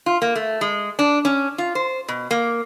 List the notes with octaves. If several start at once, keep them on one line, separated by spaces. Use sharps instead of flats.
F4
A#3
A3
G#3
D4
C#4
F4
C5
B2
A#3